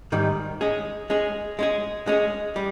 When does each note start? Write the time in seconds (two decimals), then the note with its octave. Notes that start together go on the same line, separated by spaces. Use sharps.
0.12 G#2 D#3 G3
0.61 G#3 C#4 G#4
1.10 G#3 C#4 G#4
1.59 G#3 C#4 G#4
2.07 G#3 C#4 G#4
2.56 G3